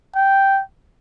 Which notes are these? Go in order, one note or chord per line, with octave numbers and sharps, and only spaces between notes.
G5